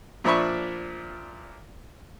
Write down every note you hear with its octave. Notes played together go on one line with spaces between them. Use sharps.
A#2 F3 D4 E5 B5 C#6